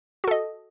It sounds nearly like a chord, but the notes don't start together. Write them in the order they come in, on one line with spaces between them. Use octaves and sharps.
F#4 A4 D#5